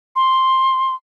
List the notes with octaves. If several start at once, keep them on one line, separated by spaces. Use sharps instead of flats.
C6